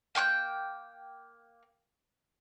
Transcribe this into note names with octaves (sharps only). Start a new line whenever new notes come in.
A#3 G5 C#6 F#6